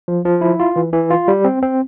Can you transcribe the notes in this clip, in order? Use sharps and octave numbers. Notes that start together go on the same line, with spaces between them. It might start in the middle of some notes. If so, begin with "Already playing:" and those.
F3
F3
E4
F4
E3
E3
F4
G3
C4
C4